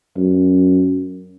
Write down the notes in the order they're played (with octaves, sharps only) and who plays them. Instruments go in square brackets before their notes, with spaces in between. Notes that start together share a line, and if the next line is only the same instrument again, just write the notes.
[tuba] F#2